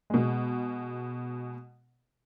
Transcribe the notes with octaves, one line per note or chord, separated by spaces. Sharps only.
B2 G#3